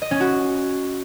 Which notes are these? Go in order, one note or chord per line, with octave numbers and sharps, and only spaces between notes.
D#5
C#4
F#4